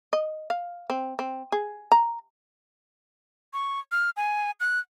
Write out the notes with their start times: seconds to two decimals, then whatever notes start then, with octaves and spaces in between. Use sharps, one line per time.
0.13 D#5
0.50 F5
0.90 C4
1.19 C4
1.52 G#4
1.92 A#5
3.53 C#6
3.92 F6
4.17 G#5
4.60 F#6